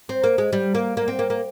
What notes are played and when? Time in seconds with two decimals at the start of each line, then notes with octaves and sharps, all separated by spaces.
0.09 C4
0.24 A#3
0.38 G#3
0.53 G3
0.75 A#3
0.97 A#3
1.08 C4
1.19 A#3
1.30 A#3